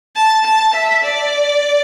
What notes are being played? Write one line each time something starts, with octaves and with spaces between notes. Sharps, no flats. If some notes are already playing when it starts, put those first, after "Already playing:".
A5
A5
E5
D5